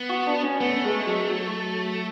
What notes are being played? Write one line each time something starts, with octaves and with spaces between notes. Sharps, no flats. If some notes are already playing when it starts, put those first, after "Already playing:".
Already playing: B3
F#4
D4
C#4
A3 B3
G#3
F#3
F#3